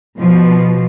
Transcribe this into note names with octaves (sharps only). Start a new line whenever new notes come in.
B2 F3